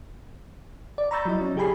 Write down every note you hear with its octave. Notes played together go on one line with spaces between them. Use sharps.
D5
A#5 B5 C#6 E6 G6 A6
F#3 E4 D#5
C#4
C#3 G4 G#4 G#5 B5 C7